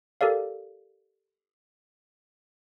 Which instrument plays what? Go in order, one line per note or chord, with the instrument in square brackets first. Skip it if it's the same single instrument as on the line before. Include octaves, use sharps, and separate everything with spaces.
[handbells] G4 A4 A#4 D5 F5